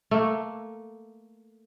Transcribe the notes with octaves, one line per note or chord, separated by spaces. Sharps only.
A3 A#3